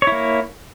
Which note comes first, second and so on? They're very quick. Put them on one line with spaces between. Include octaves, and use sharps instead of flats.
C#5 E4 A#3